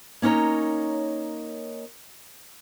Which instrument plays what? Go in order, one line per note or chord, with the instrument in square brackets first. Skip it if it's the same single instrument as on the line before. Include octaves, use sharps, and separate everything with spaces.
[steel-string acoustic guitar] A#3 C#4 D#4 C#5 A#5